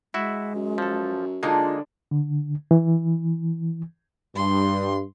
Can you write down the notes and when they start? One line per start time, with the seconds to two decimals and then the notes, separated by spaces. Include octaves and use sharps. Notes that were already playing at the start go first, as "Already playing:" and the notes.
0.14 G#3 E4 F#4 E5
0.55 F#2
0.78 F3 A4
1.43 D3 G#3 A#3 D4 D#4 F4
2.11 D3
2.71 E3
4.36 G2 C6